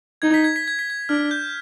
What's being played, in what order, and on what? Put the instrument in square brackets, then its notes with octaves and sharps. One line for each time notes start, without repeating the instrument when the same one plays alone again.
[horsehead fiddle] D#4 [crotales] G#6
[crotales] B6
G#6
B6
G#6
B6
G#6
[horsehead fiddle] D4 [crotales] F6
[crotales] G6